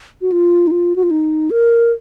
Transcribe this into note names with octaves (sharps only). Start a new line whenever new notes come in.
F#4
F4
D#4
F4
F#4
F4
D#4
A#4